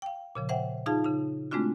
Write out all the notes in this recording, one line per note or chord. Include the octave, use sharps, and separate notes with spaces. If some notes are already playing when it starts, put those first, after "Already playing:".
F5 G5
A#2 C#3 F3
C5 E5 F#5 G5
D#4 F4 G#4 F5 A5
C#3 D#4
G#3 A3 C4 D4 F4 F#4